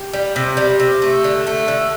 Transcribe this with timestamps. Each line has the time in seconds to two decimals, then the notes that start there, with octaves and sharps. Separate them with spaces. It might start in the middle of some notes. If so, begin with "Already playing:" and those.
Already playing: G4
0.13 G3
0.36 C3
0.57 G3
0.80 C3
1.02 A3
1.24 D3
1.47 A3
1.68 D3